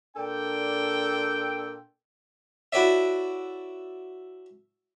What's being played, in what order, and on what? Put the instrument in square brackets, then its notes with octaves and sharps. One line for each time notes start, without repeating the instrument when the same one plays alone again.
[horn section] A#2 D4 A4 G5
[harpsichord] E4 F#4 A4 C#5 D5 E5